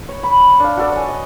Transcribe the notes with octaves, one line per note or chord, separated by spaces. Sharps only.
C#5
B5
D4 F5
F#4 A4 D5
C#5 G#5
D#5